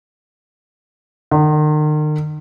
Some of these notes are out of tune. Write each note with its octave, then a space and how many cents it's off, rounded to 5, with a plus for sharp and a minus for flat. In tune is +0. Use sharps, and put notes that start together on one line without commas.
D#3 -40